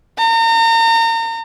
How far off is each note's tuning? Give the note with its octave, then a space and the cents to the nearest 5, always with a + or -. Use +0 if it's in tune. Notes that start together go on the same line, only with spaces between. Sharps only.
A#5 -35